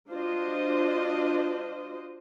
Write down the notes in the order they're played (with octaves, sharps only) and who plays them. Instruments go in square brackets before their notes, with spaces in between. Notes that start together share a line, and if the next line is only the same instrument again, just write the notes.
[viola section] D4 F4 F#4 C5 D#5